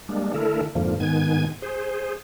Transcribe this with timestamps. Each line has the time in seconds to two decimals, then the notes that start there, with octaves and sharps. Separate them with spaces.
0.09 G3 G#3 A#3 D4
0.34 D3 A3 E4 A4 A#4
0.75 F2 G#2 D3 F3 A#3
1.00 G#2 D#3 B3 G#5 G#6
1.62 G#4 C5